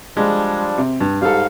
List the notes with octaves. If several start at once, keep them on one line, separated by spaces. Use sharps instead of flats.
F3 G3 G#3 D4
C3
G2
G#2 G3 A4 F5